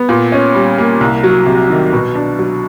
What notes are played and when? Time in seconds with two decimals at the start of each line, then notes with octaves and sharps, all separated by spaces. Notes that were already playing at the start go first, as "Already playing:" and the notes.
Already playing: B3
0.09 A#2
0.32 C#4
0.54 G3
0.78 A#3
1.01 C2
1.23 F#3
1.46 C3
1.70 D#3
1.93 B2
2.15 D4
2.39 F#3